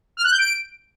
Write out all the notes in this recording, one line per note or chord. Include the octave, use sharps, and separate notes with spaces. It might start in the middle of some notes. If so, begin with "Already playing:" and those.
F6
F#6
G6
D7